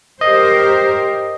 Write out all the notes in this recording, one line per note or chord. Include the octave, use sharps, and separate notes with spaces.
G4 A#4 C5 D#5